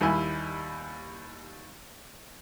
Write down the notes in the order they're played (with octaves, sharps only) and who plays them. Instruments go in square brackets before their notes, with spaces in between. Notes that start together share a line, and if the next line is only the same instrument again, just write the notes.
[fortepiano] D#2 G3 E4 G#5